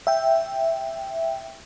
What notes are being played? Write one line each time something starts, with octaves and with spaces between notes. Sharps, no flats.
E5 G5